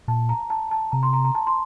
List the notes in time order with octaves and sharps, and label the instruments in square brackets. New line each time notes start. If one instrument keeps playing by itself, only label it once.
[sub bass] A#2 [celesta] A5
[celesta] A#5
A5
A5
[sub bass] C3 [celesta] A#5
[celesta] C6
A#5
A#5
A5
C6